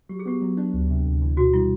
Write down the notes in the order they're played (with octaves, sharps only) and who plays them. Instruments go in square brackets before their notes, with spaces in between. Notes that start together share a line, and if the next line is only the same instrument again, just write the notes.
[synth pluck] F#3 [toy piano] G4
[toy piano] G#4
[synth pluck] B3 [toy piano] G4
[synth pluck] F#3
D4
D2
C3
D2
E3
[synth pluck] B2 [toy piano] F#4
[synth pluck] G3 [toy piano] E4